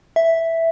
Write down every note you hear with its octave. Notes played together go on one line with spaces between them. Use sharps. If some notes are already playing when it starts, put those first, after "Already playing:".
E5